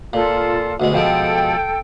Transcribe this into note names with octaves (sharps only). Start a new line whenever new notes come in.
A#2 F4 A4
D2 B2 G#3
B2 F3 G#3 A4 G5